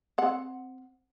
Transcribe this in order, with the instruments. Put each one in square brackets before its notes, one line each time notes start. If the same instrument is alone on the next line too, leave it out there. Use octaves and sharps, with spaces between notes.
[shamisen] C4 F#5